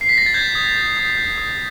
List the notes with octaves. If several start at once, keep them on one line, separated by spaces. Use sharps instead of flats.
C7
B6
A#6
A6
G6 G#6
D#6
G6
D#6
G6
D#6